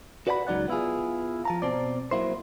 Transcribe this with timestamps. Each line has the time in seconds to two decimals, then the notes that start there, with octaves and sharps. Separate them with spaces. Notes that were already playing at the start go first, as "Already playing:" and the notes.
0.27 F#4 B4 D5 F#5 G5 B5
0.47 C#2 F#3 D#4 D5 F#5
0.68 B3 E4 F4 G#4
1.45 F3 A5 A#5
1.62 B2 C4 D5
2.11 F#3 A#3 E4 C5